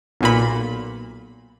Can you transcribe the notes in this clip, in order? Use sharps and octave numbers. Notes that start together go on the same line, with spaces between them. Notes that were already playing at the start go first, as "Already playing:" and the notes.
B1 A#2 B5